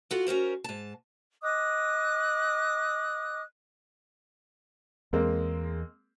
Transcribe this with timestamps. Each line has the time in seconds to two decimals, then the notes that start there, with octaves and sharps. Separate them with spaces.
0.11 F4 F#4 A4
0.27 C#4 F#4 A#4 C5
0.64 G#2 A5
1.42 D#5 D6 D#6 F#6
5.13 E2 G#3 A#3 C4